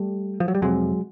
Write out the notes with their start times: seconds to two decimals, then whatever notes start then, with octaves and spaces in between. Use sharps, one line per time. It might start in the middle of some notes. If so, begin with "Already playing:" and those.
Already playing: G3 A3
0.40 F3
0.48 F#3
0.55 G3
0.62 F2 C3 F#3 G#3